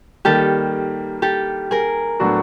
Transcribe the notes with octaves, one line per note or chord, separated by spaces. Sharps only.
D#3 G3 A#3 G4 A4
G4 A4
G#4 A#4
A2 F#3 B3 D4 F#4